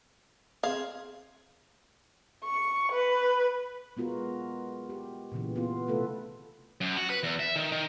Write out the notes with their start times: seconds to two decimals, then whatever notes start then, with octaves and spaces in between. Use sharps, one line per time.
0.63 C4 G#4 F5
2.44 C#6
2.92 B4
3.97 G#3 B3 F4 F#4 A#4
4.90 G4
5.32 A#2 C#3 E3
5.56 B3 F4
5.88 C3 A3 F4 A4 B4
6.81 F#2
6.97 F#4
7.10 B4
7.23 E2
7.39 E5
7.56 D#3
7.72 D#3